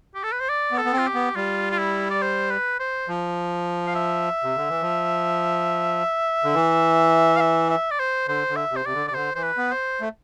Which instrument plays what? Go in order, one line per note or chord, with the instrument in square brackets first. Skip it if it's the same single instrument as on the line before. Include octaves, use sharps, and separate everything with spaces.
[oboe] G4
A4
B4
C5
D5
[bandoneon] B3
[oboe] A4
[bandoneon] B3
C4
[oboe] F4
G4
[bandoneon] B3
[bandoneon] G3 [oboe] F4
[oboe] F4
E4
D5
C5
B4
C5
[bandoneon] F3
[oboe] F5
E5
[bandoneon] C3
D3
E3
F3
D3
E3
[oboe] F5
E5
E5
D5
C5
[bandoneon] D3 [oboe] C5
[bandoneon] D3
[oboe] E5
[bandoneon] C3
[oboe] C5
[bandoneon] C3 [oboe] D5
[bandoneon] D3
[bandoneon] C3 [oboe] D5
[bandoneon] D3 [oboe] C5
[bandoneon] E3 [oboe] C5
[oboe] B4
[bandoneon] B3
[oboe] C5
[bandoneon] A3